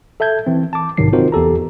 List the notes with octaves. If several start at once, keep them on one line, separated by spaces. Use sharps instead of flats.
A4 E5 A5 G6 G#6
E3 C4
A5 D6
B1 G#2 C3 D#3 F#3 C7
C4 D#4 F4 F#4 A#4 C5
E2 G4 A4 A#5